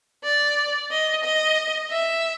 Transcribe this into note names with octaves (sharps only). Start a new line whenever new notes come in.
D5
D#5
D#5
E5